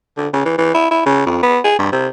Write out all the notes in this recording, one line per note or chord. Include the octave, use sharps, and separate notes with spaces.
D3
C#3
E3
E3
E4
E4
C#3
F2
B3
G#4
G2
C3